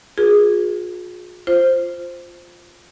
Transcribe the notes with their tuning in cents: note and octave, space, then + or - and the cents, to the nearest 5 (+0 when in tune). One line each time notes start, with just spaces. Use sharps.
F4 +40 G#4 +0 B4 -40
F4 +0 C5 +0